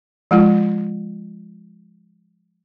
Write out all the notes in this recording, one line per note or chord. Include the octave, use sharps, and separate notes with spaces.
F3 G#3 F4